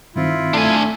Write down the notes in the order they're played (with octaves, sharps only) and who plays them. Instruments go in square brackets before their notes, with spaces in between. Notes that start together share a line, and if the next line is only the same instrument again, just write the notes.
[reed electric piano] G2 D#3 C4 [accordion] E4 F4
[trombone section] A3 [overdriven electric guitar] D4 G#5